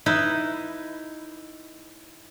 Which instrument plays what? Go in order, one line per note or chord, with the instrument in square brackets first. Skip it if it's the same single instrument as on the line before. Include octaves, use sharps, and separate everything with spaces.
[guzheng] D#4 E4 B4